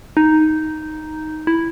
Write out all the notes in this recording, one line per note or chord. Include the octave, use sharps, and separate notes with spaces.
D#4
E4